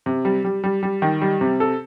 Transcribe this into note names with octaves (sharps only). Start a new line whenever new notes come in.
C3
G3
G3
G3
G3
D#3
G3
C3
A4